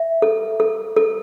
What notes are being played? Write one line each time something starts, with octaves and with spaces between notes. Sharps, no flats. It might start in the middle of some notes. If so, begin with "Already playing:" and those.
Already playing: E5
A4
A4
A4